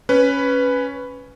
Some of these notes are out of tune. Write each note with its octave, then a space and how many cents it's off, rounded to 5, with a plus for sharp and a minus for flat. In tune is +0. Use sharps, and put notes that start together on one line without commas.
C#4 +0 B4 +5